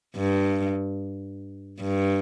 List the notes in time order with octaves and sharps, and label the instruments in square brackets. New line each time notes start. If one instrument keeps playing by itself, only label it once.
[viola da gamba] G2
G2